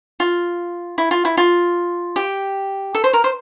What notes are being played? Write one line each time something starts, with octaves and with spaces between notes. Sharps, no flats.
F4
E4
F4
E4
F4
G4
A4
C5
A#4
C5